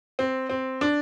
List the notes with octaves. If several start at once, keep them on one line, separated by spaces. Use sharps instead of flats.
C4
C4
D4